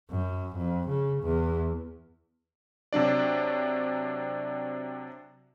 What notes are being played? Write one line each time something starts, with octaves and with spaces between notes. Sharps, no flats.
F#2
F2
C#3
E2
C3 F#3 D4 D5